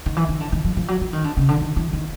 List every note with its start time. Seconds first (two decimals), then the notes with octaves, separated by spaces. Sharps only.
0.06 D#3
0.17 E3
0.29 D#3
0.40 D3
0.52 D#3
0.65 F3
0.77 F3
0.88 F#3
1.01 F3
1.13 D#3
1.24 D3
1.37 C#3
1.49 D3
1.61 D#3
1.76 E3
1.93 D#3